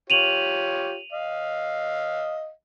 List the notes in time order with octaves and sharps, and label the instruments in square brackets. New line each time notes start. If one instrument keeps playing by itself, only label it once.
[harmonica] F4 G4 C#5 [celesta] D#7 F7 F#7
[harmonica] D#5 F5